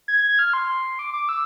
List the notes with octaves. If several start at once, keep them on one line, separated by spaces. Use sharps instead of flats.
G#6
G#6
G#6
F6
C6
D6
D6
E6